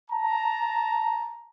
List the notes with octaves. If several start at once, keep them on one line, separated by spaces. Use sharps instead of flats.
A5 A#5